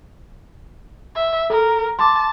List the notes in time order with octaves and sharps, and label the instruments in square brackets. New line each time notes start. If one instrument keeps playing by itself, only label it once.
[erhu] E5
[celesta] A4 [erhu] A#4
[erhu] A5 [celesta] C6 D6